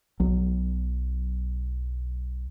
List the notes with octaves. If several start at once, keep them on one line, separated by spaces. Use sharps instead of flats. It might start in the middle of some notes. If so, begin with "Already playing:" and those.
B1 F#3